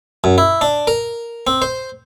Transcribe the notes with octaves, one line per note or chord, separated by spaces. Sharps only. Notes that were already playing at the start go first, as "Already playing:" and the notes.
F#2
E4
D4
A#4
C4
C5